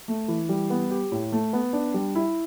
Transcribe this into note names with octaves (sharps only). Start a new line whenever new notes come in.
A3
E3
G3
B3
G4
A2
A3
B3
D4
G3
E4